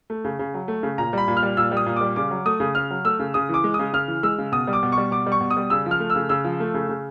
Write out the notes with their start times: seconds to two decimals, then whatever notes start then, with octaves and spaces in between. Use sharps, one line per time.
0.10 A3
0.25 C#3
0.39 C#3
0.54 F#3
0.68 A3
0.83 C#3
0.98 A#2 A#5
1.13 G3 B5
1.28 A#2
1.37 F6
1.43 G3
1.57 A#2 E6
1.71 G3
1.77 D#6
1.86 A#2
1.96 G3 D6
2.16 C#3 D6
2.31 F#3
2.46 A3 D#6
2.60 C#3
2.75 C#3 F6
2.90 F#3
3.05 A3 E6
3.19 C#3
3.34 C#3 D#6
3.49 E3 D6
3.64 G#3
3.74 D#6
3.79 C#3
3.93 C#3 F6
4.08 E3
4.23 G#3 E6
4.38 C#3
4.52 B2 D#6
4.67 G3
4.73 D6
4.83 B2
4.92 C#6
4.98 G3
5.11 B2 D6
5.26 G3
5.32 C#6
5.41 B2
5.51 D#6
5.57 G3
5.70 C#3 E6
5.86 F3
5.91 F6
6.00 A3
6.10 E6
6.15 C#3
6.29 C#3 E6
6.44 F3
6.60 A3
6.74 C#3
6.89 C#3